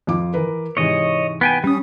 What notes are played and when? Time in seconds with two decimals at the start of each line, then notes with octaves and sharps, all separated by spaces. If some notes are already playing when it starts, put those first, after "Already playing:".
0.07 F2 F4 D6
0.34 E3 A#4 B4
0.77 G#2 C3 E3 C#5 D#5
1.41 B3 G5 G#5
1.64 G3 C#4 D#6